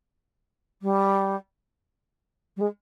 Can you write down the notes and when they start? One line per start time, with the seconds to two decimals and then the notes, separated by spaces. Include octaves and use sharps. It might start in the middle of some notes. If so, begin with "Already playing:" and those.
0.82 G3
2.56 G3
2.60 G#3